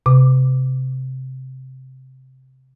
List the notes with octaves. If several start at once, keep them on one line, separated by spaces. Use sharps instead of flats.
C3 D6